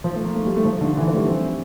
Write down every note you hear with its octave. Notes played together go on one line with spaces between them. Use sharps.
F3
A3
A#3
A3
G3
A3
F3
D3
E3
F3
A3
G3
C4